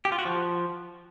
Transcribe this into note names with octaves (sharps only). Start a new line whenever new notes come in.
G4
F4
F#4
F3